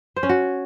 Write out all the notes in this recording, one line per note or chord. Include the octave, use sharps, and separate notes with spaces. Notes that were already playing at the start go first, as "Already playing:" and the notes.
C5
C#4
F#4